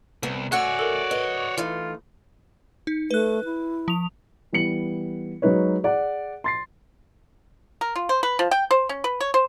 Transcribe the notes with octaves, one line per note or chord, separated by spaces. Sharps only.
C2 B3
A3 F#4 C#5 D5 E5 F#5 G#5 F#6
A4 A#4
B4 D#5
E3 A3 D#4 F4
D#4
A3 B4 F#6
E4
F3 F7
E3 G3 B3 C#7 F#7
F#3 G#3 D#4 B4 C#5
G#4 D5 F#5
C6 A6 C7
A#4
F4
C5
B4
F3
G5
C5
C#4
B4
C#5
C5